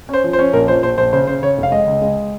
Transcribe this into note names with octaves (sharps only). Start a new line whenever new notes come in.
C#4 C5
F3
C5
C#4
A#1 A#4
F3 C5
A#1 C5
A#1 C5
C#3 C5
C#3 C5
C#3 C#5
F1
F5
G#3 D#5
C#2
G#3